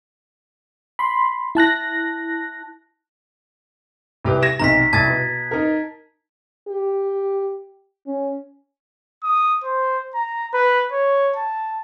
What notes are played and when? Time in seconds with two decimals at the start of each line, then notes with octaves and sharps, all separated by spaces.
0.99 B5 C6
1.55 E4 A5 F#6 A#6
4.24 C2 G4 B4
4.42 G#6 A#6 E7
4.60 B1 C3 D#3 A#5 B6
4.93 C2 A5 G#6 A6
5.08 B2
5.51 D#4 A#4
6.68 G4
8.07 C#4
9.24 D#6
9.64 C5
10.14 A#5
10.54 B4
10.92 C#5
11.36 A5